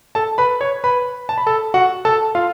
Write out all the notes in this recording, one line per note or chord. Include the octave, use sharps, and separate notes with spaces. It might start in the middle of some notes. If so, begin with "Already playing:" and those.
A4 A5
B4 B5
C#5 C#6
B4 B5
A5
B5
A4 A5
F#4 F#5
A4 A5
F4 F5